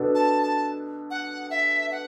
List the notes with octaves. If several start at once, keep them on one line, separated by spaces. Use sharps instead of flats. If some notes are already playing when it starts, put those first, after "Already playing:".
Already playing: B2 B3 D4 A4
A5
A5
F#5
E5
F#5